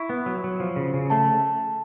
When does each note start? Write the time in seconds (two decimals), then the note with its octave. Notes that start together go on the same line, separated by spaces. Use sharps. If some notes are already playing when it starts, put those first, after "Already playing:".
Already playing: E4 C#6
0.10 B3
0.26 F#3
0.44 F#3
0.60 F3
0.76 C#3
0.94 C#3
1.10 A3 A5